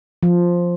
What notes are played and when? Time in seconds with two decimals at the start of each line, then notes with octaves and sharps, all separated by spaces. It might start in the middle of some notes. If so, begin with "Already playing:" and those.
0.23 F3